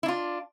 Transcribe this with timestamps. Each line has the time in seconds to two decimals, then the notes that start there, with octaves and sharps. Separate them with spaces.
0.03 E4
0.06 D4
0.08 F4